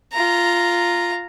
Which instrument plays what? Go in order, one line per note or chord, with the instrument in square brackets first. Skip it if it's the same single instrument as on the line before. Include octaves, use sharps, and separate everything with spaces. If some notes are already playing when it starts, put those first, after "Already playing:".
[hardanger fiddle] F4 A#5